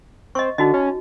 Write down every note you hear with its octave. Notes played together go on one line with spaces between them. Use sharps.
C4 D#5 C#6
D3 D#4 F#4 D#5
C#4